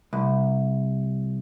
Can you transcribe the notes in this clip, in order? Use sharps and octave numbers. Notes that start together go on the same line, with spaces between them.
C2